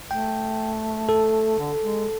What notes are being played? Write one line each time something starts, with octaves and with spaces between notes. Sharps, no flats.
A3 G5
A4
D3
G#3